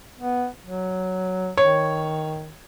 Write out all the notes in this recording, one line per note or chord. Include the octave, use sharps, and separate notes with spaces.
B3
F#3
D#3 C#5